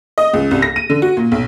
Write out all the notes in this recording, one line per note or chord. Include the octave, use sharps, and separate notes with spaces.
D#5
C#2
C2
A#6
D#7
D3
F#4
A#2
B1